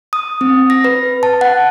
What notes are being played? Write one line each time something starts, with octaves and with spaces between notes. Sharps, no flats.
D#6
C4
A#6
B4
A5
F#5